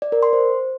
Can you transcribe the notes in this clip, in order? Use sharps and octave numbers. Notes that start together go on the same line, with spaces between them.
D5
A#4
C6
C5